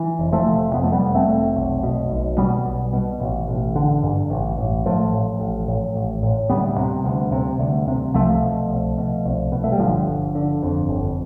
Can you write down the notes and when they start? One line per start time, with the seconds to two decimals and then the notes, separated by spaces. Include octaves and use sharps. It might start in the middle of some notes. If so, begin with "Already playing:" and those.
Already playing: E3
0.19 F1
0.32 F3 A3
0.47 C3
0.73 F2 B3
0.84 A3
0.92 G3 B3
1.01 F1
1.15 A3 C4
1.29 F1
1.55 B1
1.83 B2
2.11 B1
2.38 B2 G3 B3
2.65 B1
2.93 B2
3.20 A1
3.48 A1
3.76 D3
4.03 G2
4.30 A1
4.57 A1
4.85 A1 F3 A3
5.13 A2
5.40 A1
5.68 A2
5.95 A1
6.23 A2
6.50 D2 G3 B3
6.78 C3
7.05 D2
7.32 C3
7.59 D2
7.88 C3
8.14 C2 F3 A3
8.42 B2
8.69 C2
8.98 B2
9.25 C2
9.52 B2
9.64 A3
9.72 G3
9.79 G1 D3 F3
10.08 G1
10.35 D3
10.63 F2
10.89 G1